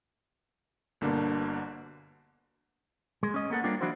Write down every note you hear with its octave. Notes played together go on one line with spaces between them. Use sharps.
G1 B2 D3 A#3 D4
G#3
C#4 D#5
A#3 B3 A4 F#5
G3 A#3 C4 D4 F4
F3 F#3 D4 E4 F#4 C5